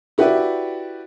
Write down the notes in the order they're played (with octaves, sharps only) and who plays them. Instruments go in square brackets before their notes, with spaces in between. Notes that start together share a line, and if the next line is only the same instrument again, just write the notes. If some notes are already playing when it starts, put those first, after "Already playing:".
[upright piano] E4 F#4 G4 B4 D5 E5